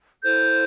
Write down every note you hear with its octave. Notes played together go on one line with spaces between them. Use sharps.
E4 A4 C5 G6